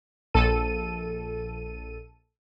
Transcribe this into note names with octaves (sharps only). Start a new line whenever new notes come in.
A#1 A4 D#7